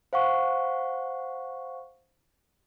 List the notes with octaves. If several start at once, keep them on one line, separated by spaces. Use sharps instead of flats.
C5 F5 F#5 C#6